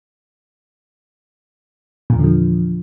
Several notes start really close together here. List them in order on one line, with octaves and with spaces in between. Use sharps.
A#2 E2 D3 F3